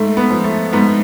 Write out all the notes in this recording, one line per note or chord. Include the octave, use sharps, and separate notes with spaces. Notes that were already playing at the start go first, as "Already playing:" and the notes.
Already playing: G#2 A3
B3
F3
A3
G#2 B3